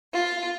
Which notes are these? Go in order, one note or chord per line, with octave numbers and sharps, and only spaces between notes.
F4